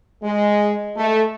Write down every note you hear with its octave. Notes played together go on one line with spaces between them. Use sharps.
G#3
A3